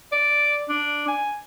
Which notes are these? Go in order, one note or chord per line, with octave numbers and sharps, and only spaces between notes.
D5
D4
G#5